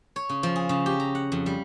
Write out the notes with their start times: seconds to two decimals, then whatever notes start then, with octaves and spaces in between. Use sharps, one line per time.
0.16 C#5
0.29 C#3
0.43 F3
0.56 G#4
0.69 C#3
0.86 G4
1.00 A#5
1.15 F#5
1.32 F2
1.46 G3